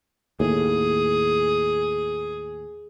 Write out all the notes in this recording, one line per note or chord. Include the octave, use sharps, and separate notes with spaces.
D#2 A2 G#4